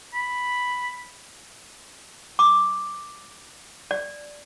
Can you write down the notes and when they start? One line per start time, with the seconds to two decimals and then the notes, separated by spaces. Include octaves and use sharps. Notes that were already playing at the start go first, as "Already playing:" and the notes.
0.14 B5
2.39 D6
3.91 D5